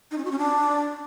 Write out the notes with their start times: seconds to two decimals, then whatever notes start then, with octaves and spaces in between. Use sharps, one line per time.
0.11 D#4
0.18 C#4
0.25 F#4
0.32 C#4
0.38 D4